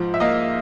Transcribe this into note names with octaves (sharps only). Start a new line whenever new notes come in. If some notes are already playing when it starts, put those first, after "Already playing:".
Already playing: G#2 F3
E5
A#3 D#5 F5